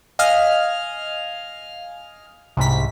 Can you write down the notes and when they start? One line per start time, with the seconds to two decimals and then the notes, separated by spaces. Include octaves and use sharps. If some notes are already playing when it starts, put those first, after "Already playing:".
0.19 D#5 F5 G#5 F6
2.57 C2 G#2 B6